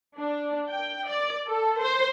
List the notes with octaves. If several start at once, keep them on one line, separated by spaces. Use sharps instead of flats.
D4
G5
D5
A4
C5